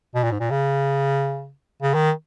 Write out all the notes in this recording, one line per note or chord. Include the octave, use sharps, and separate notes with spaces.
B2
A#2
G#2
A#2
C#3
C#3
D#3